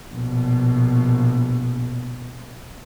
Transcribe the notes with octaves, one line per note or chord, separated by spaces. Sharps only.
A#1 B2